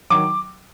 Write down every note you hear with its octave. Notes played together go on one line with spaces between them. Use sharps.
D#3 F#3 D6